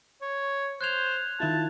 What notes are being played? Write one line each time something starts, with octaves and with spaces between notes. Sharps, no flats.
C#5
C5 F#6 G#6 F7
D#3 E4 F4 A5